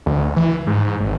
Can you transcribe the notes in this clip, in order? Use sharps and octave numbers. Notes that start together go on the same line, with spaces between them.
D2
E3
G#2
G#1